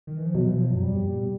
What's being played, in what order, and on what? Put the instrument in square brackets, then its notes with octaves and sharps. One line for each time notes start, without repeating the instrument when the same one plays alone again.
[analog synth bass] D#3
E3
F3
[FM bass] B2 [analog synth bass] F#3
[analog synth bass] E3
F3
[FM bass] F#2 [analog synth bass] F#3
[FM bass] F2 [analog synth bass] G3
[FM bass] G2
A#2
B2